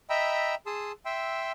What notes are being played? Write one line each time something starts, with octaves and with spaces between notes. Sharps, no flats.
D#5 E5 G5 A#5 B5 E6
G#4 A5 C6 D#6 E6
E5 G5 C6 E6